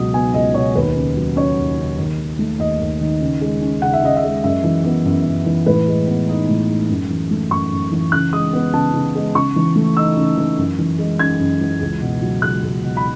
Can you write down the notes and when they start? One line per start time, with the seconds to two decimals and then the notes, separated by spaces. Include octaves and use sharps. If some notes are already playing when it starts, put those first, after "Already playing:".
Already playing: C#2 B2 F#3 D#6
0.14 B3 G#5
0.34 C#2 D#5
0.54 B2 C#5
0.75 D#2 B4
0.95 C#3
1.17 F#3
1.36 C#4 C#5
1.58 D#2
1.78 C#3
1.98 D#2
2.18 D#3
2.39 A3
2.59 D#2 D#5
2.80 D#2
3.01 D#3
3.21 C#3
3.41 G#3
3.62 C#4
3.82 C#3 F#5
3.93 E5
4.03 C#3 D#5
4.16 E5
4.23 G#3
4.44 F#2 E5
4.64 E3
4.84 B3
5.05 F#2
5.26 F#2
5.46 E3
5.66 A2 B4
5.87 G#3
6.07 B3
6.28 D#4 D#5
6.49 A2
6.69 G#3
6.90 F#2
7.10 E3
7.31 A3
7.51 F#2 C#6
7.72 F#2
7.92 E3
8.12 C#3 F#6
8.33 G#3 D#6
8.53 B3
8.73 C#3 A5
8.94 C#3
9.15 G#3
9.35 C#3 C#6
9.56 E3
9.76 A3
9.96 D#4 E6
10.17 C#3
10.37 E3
10.58 F#2
10.79 E3
10.98 G#3
11.19 C#4 G#6
11.40 F#2
11.61 E3
11.81 C#2
12.01 B2
12.22 F#3
12.42 C#2 F#6
12.63 C#2
12.83 B2
12.97 B5